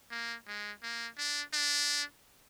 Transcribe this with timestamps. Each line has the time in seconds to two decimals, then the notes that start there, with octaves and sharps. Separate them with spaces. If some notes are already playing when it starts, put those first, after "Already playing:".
0.11 A#3
0.47 G#3
0.82 A#3
1.18 D4
1.53 D4